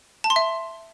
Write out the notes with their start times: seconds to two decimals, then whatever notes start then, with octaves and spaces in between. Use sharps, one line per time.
0.24 A5
0.30 C6
0.36 E5